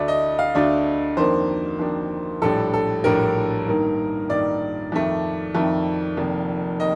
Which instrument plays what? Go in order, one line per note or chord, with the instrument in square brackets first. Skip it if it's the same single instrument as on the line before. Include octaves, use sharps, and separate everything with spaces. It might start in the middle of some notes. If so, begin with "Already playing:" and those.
Already playing: [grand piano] D2 D3 A3 D4 D5
D#5
F5
D2 D3 A3 D4 D5
F2 D#3 A#3 D4 C5
F2 D#3 A#3 D4
A#1 A2 G3 D4 A4
A4
A#1 A2 G3 D4 A#4
G2 D#3 A#3 D#4
G2 D#3 A#3 D#4 D5
F2 D#3 A3
F2 D#3 A3
F1 F2 D#3 A#3
D#3 A#3 D#5